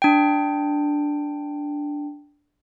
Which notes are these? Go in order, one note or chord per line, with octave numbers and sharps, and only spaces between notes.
D4 G5